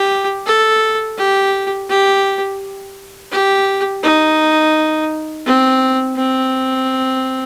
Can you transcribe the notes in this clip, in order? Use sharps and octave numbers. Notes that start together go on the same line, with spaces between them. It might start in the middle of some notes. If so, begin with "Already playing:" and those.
Already playing: G4
A4
G4
G4
G4
D#4
C4
C4